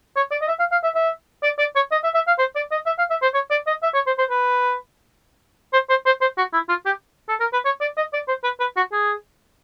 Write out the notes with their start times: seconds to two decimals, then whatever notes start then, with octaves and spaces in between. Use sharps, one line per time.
0.16 C#5
0.31 D5
0.42 D#5
0.48 E5
0.59 F5
0.72 F5
0.84 E5
0.95 E5
1.43 D5
1.59 D5
1.76 C#5
1.92 D#5
2.04 E5
2.14 E5
2.27 F5
2.39 C5
2.55 D5
2.71 D#5
2.86 E5
2.98 F5
3.10 E5
3.22 C5
3.34 C#5
3.51 D5
3.67 D#5
3.83 E5
3.94 C#5
4.07 C5
4.18 C5
4.30 B4
5.73 C5
5.89 C5
6.06 C5
6.21 C5
6.38 F#4
6.53 E4
6.69 F4
6.86 G4
7.29 A4
7.40 A#4
7.53 B4
7.65 C#5
7.81 D5
7.97 D#5
8.13 D5
8.28 C5
8.44 B4
8.60 B4
8.77 F#4
8.92 G#4